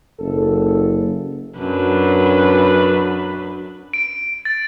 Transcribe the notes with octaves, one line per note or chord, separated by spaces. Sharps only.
F#1 A4
F#2 D4 B4
D7
A6